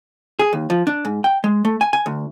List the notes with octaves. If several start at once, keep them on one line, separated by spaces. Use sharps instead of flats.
G#4
D#2
F3
D4
G#2
G5
G#3
A3
G#5
G#5
D2